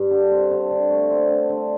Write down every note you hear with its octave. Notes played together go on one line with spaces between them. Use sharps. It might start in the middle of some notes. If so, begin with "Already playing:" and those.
Already playing: G2
D3
C4
D3
D3
A3
C4
D3
D3